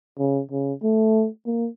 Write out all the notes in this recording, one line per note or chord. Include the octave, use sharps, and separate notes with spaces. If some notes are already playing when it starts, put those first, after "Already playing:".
C#3
C#3
A3
A#3